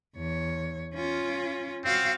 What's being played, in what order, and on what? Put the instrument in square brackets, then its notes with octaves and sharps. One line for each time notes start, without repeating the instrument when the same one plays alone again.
[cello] E2 C#5
C#4 F4
[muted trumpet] C4 [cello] F#4 F5